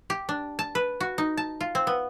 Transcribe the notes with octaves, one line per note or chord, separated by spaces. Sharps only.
G4
D4
A5
B4
F#4
D#4
A5
F4
C4
B3